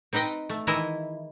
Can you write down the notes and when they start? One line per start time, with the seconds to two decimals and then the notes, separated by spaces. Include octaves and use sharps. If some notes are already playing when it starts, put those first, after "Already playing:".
0.13 C4 D#4 B4 D#5 G5
0.49 A3
0.67 D#3 E3 G#3 E4 D#5 E5